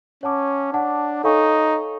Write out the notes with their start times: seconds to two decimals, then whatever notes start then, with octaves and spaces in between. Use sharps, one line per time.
0.23 C#4 C#5 F#5 A5 D6
0.73 D4 C#5 F#5 A5 D6
1.24 D#4 A4 C#5 F5 G#5 C#6